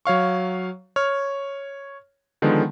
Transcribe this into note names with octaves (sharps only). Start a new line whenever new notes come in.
F#3 C#5 F5 C#6
C#5 F6
D3 D#3 F3 G#3 B3